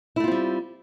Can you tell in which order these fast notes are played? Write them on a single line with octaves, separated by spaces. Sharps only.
E4 A3 F4 C4 G3